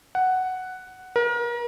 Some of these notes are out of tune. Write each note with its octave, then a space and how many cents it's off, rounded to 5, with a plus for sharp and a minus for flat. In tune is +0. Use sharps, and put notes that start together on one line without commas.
F#5 +5
A#4 +35